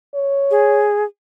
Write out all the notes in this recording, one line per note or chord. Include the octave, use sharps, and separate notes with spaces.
C#5
G#4